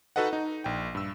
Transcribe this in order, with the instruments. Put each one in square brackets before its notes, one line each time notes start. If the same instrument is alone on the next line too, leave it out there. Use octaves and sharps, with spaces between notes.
[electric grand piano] D#4 F#4 A4 B4 D#5 F#5
D#4
A#1 G5
G2 E6